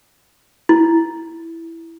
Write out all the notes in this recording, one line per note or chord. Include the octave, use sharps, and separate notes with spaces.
E4